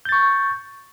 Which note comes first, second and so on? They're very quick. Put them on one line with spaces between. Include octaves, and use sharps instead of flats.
G6 A6 C#6